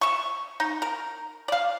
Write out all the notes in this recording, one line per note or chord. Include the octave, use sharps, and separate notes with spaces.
E5 C#6
D#4
A#4
D5 F5